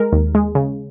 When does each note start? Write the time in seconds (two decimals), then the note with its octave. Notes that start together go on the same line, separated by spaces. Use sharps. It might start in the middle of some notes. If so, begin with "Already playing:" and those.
Already playing: G#3 A#4
0.13 D#2
0.35 G#3
0.55 C#3